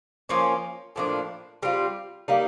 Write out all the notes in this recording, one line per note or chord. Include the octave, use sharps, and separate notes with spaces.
F3 A#3 C#4 F4
A2 F3 A#3 D4
G3 C4 F4
G3 A#3 D#4